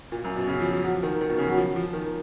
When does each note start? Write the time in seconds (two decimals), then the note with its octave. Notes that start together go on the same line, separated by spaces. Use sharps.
0.12 A#2
0.24 F#2
0.36 B2
0.47 C#3
0.60 F3
0.72 F3
0.84 F#3
0.95 F3
1.03 D#3
1.21 D#3
1.30 B2
1.38 C#3
1.48 F#3
1.57 F3
1.76 F3
1.93 D#3